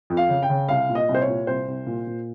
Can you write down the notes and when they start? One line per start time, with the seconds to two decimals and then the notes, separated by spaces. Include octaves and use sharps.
0.10 F2
0.17 F5
0.29 C#3
0.43 G5
0.49 C#3
0.69 C2 F5
0.89 A#2
0.95 D#5
1.09 C2
1.14 C5
1.21 C#5
1.27 A#2
1.47 C2 C5
1.68 C2
1.86 A#2
2.07 A#2